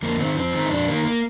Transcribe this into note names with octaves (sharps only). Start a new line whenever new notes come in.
F2 A#3
D#3 C4
F2 C4
D#3
D#4
F2 D4
D#3 A#3
A#3